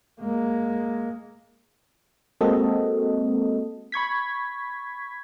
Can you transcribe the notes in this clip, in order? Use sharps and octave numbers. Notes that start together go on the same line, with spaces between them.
G#3 A#3
G#3 A#3 C4 F#4 A4 D#5
B5 C#6 G#6 B6